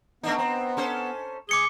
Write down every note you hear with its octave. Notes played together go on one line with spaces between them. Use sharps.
A3 B3 D4 D#4
C4
C#4 A4 C5
G#4 D6 C#7 G7